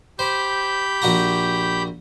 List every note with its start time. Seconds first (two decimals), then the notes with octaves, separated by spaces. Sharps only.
0.19 G4 C5 B5 G6
1.02 A#1 F#4 A#5